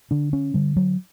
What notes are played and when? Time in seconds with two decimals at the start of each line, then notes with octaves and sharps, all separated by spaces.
0.11 D3 D4
0.33 C#4
0.54 D3 G3
0.77 F#3